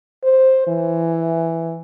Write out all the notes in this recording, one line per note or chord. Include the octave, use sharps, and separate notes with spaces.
C5
E3